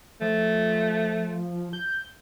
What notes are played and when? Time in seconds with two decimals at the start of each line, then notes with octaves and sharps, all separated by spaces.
0.21 F3 A3
1.73 G6